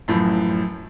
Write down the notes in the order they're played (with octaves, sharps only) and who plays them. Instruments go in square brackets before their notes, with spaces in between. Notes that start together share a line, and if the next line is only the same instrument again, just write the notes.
[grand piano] F#2 A2 E3 F3